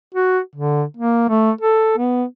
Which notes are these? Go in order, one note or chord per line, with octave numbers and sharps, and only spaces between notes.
F#4
D3
A#3
A3
A4
B3